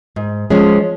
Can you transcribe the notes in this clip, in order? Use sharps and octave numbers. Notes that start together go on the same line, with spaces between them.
G#2
F3 G#3 C#4